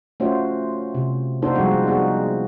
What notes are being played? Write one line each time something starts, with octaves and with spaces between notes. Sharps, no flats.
A3 C#4 F4 F#4 C5
C3
A#3 D4 D#4 F#4 A4 C5
F3 G3 G#3 C4 F#4
B3 C4 D#4 F#4 G#4